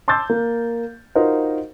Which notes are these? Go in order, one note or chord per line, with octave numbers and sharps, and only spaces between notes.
A5 C6 D6 E6 G6 A6
A#3
D#4 F4 F#4 A#4 C5